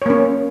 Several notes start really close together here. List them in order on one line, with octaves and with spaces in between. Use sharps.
C#5 A#3 C#4